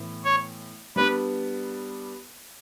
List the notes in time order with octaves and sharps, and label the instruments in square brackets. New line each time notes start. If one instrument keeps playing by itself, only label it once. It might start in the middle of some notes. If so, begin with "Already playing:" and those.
Already playing: [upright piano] A2 E3 B3
[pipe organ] C#5
[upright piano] G3 B3 D4 [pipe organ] B4